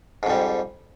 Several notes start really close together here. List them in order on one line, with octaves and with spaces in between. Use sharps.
G#2 F2 G3